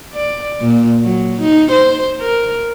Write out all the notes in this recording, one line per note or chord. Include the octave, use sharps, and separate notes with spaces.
D5
A#2
F#3
D#4
C5
A#4